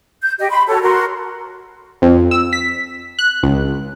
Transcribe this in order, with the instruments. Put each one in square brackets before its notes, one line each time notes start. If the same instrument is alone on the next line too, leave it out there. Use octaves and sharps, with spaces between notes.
[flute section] G6
G4 D#5
B5 C6
F#4 A4 C#5
F#4 A#4 C6
[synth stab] F2
E6
B6
F#6
C#2